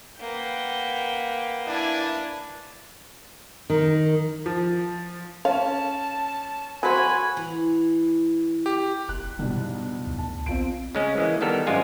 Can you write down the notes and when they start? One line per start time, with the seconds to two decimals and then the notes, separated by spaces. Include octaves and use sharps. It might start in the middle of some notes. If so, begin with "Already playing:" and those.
0.20 A#3 B4 F#5 G5
1.67 D4 E4 G#5
3.70 D#3
4.46 F3
5.45 C#4 F5 A5
6.83 F#3 F#4 C5 G#5 B5
7.37 E3
8.66 G4
9.09 F1 F#6
9.39 B1 E2 G2 C3
10.07 C#2
10.18 D2 A5
10.46 A#1 C4 F4 D7
10.95 C#3 G#3 C#4
11.18 E3 G#3 A#3
11.41 D#3 G3 B3 A4 A#4
11.67 G#1 F#2 G3 G#3 F4 G#5